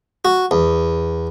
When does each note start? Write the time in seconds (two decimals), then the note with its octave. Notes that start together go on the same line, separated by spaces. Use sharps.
0.25 F#4
0.51 E2